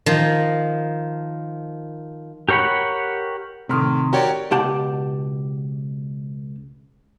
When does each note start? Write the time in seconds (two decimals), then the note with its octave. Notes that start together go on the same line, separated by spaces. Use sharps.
0.06 D#3 F3
2.49 G4 A#4 C#5 F#5 B5
3.69 A2 C3 D#3 F6
4.13 F#4 G4 A#4 C#5 D5
4.51 C#2 B2 G4 F#5 A5